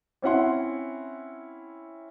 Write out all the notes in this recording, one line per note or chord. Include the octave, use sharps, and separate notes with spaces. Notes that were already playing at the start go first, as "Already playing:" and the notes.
C4 C#4 E4 F#5 C6